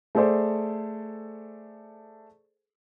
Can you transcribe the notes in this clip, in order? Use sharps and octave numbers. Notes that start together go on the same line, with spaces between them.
A3 G#4 A4 C5 D5